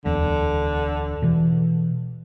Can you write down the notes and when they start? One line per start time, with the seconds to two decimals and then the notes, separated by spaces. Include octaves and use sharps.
0.05 D1 E2 D3
1.22 B2 E3